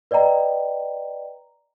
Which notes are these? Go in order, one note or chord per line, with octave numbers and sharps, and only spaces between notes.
B4 D5 D#5 G5 A#5